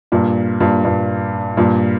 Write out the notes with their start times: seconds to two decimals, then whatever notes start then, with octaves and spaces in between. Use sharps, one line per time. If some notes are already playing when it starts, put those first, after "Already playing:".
0.12 G2 A#2
0.60 G2 A#2
0.85 G2 A#2
1.57 G2 A#2